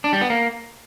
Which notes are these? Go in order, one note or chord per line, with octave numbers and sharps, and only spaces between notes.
D4
G3
B3
A#3